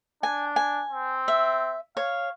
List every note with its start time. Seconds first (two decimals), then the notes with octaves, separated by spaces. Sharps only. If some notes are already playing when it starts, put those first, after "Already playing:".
0.23 D4 G#5
0.56 G#5
0.91 C4
1.28 E5
1.97 C#5 F5